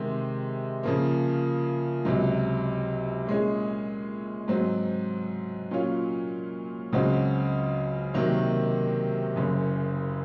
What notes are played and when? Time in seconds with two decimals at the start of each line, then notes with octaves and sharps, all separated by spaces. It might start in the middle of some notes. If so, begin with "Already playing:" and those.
Already playing: C3 D#3 G#3
0.83 C#3 F3 A#3
2.05 C#2 C3 F#3
3.27 A#2 G#3 C#4 G#4
4.48 G#2 F#3 C4
5.71 A#2 F#3 C#4 F4
6.92 C#2 C#3 F#3 C4 F#4
8.14 C3 D#3 F#3 A#3
9.36 F#1 F#2 C#3